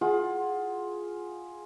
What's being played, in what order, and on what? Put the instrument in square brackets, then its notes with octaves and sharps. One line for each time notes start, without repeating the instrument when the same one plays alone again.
[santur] F4 G#4 F#5